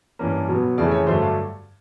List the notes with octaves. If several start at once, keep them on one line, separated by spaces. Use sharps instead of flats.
G2 E3 G3 A#3 C#4
B2 F#3 B3
F2 C#3 E3 A3 D5
C#5
G2 D3 F#3 A3 D4 C5
F5